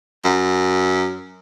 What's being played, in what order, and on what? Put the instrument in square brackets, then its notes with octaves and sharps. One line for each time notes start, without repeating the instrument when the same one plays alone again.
[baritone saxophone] F#2